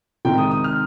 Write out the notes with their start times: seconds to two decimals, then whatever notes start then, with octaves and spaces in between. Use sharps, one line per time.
0.25 C3 D#3 G#3 G5
0.38 D#6
0.51 D#6
0.64 F6